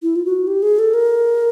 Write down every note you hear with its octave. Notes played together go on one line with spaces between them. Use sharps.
E4
F4
F#4
G4
G#4
A4
A#4